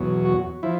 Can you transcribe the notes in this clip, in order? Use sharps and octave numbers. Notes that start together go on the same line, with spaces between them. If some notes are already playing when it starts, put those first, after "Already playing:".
Already playing: E2 B2 F#3
F#4
F3 E4